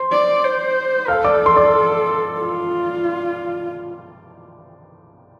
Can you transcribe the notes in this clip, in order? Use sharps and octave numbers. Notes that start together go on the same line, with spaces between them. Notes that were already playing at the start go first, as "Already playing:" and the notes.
Already playing: C5 C6
D5
C5
A4 F5 F6
D5 D6
C6
D5 D6
F4